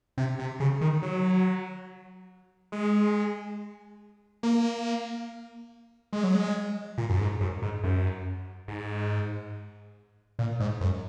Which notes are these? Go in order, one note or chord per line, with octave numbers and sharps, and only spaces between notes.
C3
C3
C#3
D#3
F#3
G#3
A#3
G#3
F#3
G#3
A#2
F#2
G#2
F#2
G#2
F#2
G#2
A#2
G#2
F#2